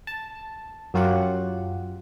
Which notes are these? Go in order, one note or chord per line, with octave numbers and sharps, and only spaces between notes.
A5
F#2 F#3 F4 G4 F#5